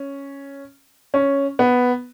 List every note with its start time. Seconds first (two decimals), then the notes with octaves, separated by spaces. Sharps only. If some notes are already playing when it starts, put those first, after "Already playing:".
Already playing: C#4
1.14 C#4
1.59 B3